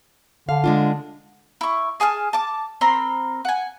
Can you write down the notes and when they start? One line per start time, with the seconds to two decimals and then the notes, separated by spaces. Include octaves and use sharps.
0.49 D3 F5
0.64 G#3 D4 F4
1.61 E4 C#6
2.00 G#4 G#5 A5 F6
2.33 A5 D6
2.81 C4 A#4 B5 C6
3.45 F#5 G#5